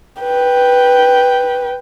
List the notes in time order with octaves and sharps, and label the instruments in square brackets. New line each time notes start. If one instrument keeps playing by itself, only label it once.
[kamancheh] B4 G5